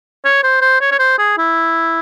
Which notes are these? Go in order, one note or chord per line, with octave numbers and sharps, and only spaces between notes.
C#5
C5
C5
C#5
C#5
C5
G#4
E4